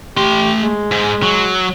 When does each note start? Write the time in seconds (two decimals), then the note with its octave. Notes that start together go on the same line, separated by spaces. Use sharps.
0.17 A3 G4 C6
0.61 G#3
0.91 G#2
1.23 F#3